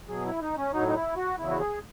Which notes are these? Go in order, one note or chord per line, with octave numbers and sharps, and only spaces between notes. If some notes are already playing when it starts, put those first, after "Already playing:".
B2 F#3 G#4
E4
D#4
C#4
A2 F#3 D#4
D#4
E4
F#4
E2 C#3 F#3 E4
F#4
G#4